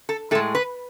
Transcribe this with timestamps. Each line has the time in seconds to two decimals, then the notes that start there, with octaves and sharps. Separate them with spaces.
0.09 A4
0.31 A2 A4
0.35 G#3
0.55 B4